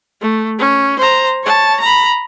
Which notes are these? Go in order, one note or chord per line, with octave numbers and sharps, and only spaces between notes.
A3
C#4
C5 A#5
C#5 A5
A#5 B5